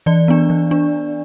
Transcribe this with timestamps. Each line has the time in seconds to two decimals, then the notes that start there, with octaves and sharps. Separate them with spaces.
0.06 E3 D5
0.28 B3 D4
0.50 E3
0.71 D4